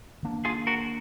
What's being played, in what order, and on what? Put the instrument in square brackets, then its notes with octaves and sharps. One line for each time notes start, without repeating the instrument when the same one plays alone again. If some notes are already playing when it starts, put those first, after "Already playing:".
[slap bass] D#3 A#3 D4
[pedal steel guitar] F4 G#4
F#4 A#4